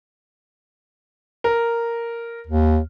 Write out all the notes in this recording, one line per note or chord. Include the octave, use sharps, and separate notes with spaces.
A#4
D#2